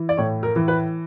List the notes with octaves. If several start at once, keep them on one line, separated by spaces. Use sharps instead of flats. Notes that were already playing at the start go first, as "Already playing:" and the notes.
Already playing: E3
D5
A2 C#5
A#4
E3
B4